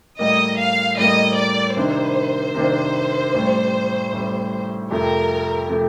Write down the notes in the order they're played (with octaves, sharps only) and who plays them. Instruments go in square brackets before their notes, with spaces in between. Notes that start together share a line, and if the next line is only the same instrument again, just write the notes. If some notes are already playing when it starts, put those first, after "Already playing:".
[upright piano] A2 G3 A#3 [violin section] D#5
[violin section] F5
[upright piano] A2 G3 A#3 [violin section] D#5
[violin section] D5
[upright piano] C3 D#3 A#3 D4 [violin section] C5
[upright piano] C3 D#3 A#3 D4
A1 A2 G3
A1 A2 G3
[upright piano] F2 C3 F3 A3 [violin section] A#4
[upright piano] C3 F3 A3